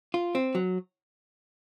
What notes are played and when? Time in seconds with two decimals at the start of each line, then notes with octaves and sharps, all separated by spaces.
0.14 F4
0.35 C4
0.55 F#3